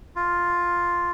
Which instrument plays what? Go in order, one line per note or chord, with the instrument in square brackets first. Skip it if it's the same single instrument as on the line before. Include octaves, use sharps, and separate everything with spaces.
[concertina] F4